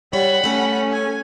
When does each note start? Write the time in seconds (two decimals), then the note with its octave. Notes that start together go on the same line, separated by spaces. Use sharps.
0.13 G3 C#5 F#5 B5
0.44 A3 C#4 A4
0.92 G#5